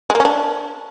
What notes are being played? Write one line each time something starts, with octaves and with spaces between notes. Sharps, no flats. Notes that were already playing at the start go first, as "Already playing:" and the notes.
G#3
A#3
C#4
D4